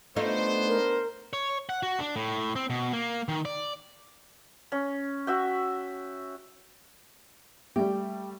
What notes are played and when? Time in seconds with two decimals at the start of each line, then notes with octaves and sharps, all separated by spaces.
0.16 A3 B3 D4 D#4 F4 C5
0.68 A#4
1.33 C#5
1.69 F#5
1.83 F#4
2.00 D4
2.16 A2
2.56 C4
2.70 B2
2.93 A#3
3.28 D#3
3.45 D5
4.72 C#4
5.27 F#4 E5 G5
7.76 G3 A3 G4